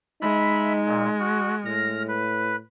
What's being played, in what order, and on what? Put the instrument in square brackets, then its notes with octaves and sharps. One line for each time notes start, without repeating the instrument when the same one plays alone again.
[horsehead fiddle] G#3 [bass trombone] D#4 [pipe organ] E5 B5
[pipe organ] A#2
F#4
[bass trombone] A2 [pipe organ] F6 A#6
[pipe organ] B4